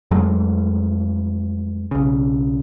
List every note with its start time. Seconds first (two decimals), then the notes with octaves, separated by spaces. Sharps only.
0.11 F2 F#3 G#3 A3
1.91 B1 C#3